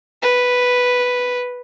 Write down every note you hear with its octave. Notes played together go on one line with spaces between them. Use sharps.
B4